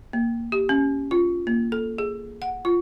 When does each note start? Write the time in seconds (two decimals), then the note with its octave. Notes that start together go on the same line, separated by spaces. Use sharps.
0.13 A#3
0.52 G4
0.69 C#4
1.11 F4
1.47 A#3
1.72 A4
1.98 G#4
2.42 F#5
2.65 F4